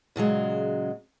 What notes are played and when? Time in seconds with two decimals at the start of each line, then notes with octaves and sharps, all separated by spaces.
0.16 A#2 C#3 F#3 G#3